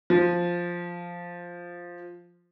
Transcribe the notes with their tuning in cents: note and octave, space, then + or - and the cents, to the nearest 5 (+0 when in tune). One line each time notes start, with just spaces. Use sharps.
F3 +0